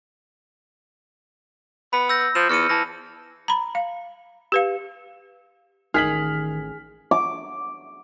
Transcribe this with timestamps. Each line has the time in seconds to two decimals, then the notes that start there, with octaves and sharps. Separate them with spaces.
1.93 B3 B5
2.09 E6 G6 A#6
2.21 E6
2.35 F3 E7
2.49 E2 F6 C#7 D#7
2.69 E3 A5 A#6
3.48 A#5 B5
3.75 F5
4.52 G4 B4 F5
5.94 A1 D#3 G#4 F6 B6 F#7
7.11 D6